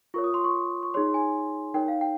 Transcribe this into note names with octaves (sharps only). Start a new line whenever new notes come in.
F4 A#4 C#5 C#6
D#6
C6
C#6
C#6
D#4 G#4 C#5 C6
G#5
D#4 A#4 C#5 G5
F5
G5